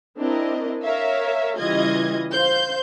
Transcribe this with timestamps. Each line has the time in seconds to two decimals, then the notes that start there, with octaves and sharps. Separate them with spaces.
0.18 C4 D4 E4 A#4 D#5
0.83 A#4 C#5 E5 F5
1.58 C#3 E3 G3 F4 D#5 G#6
2.32 C5 F5 C6 G6